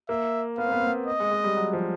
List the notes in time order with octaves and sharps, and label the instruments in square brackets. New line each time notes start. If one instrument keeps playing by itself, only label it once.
[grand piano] A#3 [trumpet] E5
[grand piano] B3 [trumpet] F5
[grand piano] C4
B3
C4
B3
[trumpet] D#5
[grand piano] G#3
G#3
G3
F#3
F3